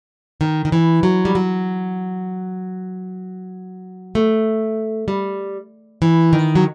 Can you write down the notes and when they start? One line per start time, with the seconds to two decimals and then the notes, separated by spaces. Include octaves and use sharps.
0.41 D#3
0.65 D#3
0.72 E3
1.03 F#3
1.25 G3
1.35 F#3
4.15 A3
5.08 G3
6.02 E3
6.33 D#3
6.55 F#3